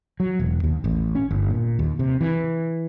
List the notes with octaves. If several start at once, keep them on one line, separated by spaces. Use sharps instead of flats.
F#3
E1
D#2
A1
C#4
G1
A#2
D#2
C3
E3